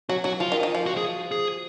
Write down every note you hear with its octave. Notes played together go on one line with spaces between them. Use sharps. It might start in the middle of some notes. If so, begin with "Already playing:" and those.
F#3 F#4
F#3 F#4
F3 F4
D#3
D#3
F3
F#4
G#4
G#4